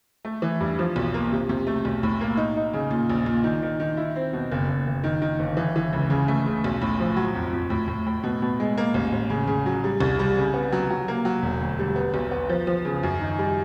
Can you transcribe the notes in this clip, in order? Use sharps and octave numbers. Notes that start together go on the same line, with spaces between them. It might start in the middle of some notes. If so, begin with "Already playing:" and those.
A3
E3
G2
F3
B1
A#3
C3
C3
A3
B1
A2
A#3
D#4
D#4
C#3
A#2
A#1
A#2
D#3
D#3
D#3
E4
C4
B2
F#1
F#1
F#1
D#3
D#3
G1
E3
E3
C#2
C#3
A3
C#3
B1
A2
F3
F#3
F2
F2
A2
A2
A2
B2
B2
G#3
A#3
A1
A1
C#3
C#3
F#3
G3
C2
G3
C#3
B3
F#3
F#3
A#3
F#3
E1
D2
G3
B3
B1
B3
F3
F3
C#3
F#2
D#3
G3